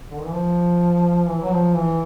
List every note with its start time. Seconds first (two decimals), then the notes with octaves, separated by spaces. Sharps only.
0.11 D3
0.18 D#3
0.26 E3
0.33 F3
1.27 E3
1.42 F#3
1.51 F3
1.75 E3